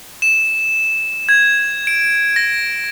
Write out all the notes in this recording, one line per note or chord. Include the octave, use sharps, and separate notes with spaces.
E7
G#6
D7
A#6